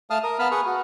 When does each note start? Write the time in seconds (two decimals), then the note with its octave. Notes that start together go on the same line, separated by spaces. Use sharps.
0.10 A3 F5 A5 D#6 F6
0.24 A#4 D#6
0.39 B3 F5 A5 B5 F6
0.51 G#4 B4 C#6 D#6
0.66 F#4